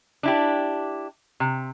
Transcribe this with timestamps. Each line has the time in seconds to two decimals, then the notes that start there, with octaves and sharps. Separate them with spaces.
0.23 D4 E4 G4
1.40 C3